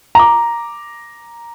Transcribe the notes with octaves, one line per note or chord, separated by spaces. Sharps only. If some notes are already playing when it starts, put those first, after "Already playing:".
A#5 D6